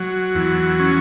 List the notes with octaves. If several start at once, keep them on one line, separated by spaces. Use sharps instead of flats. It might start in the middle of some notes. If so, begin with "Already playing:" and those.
Already playing: F#3
E2
C#4